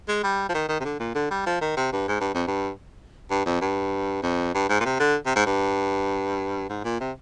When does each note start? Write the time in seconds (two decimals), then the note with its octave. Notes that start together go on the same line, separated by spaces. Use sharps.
0.08 G#3
0.24 G3
0.49 F3
0.54 D#3
0.69 D#3
0.80 C3
0.85 D3
1.00 A#2
1.15 D3
1.31 G3
1.46 F3
1.61 D#3
1.77 C3
1.92 G2
2.08 G#2
2.20 G2
2.34 F2
2.47 G2
3.30 G2
3.46 F2
3.61 G2
4.23 F2
4.54 G2
4.69 G#2
4.80 A#2
4.85 C3
5.00 D3
5.26 C3
5.36 G#2
5.46 G2
6.70 G#2
6.84 A#2
7.00 C3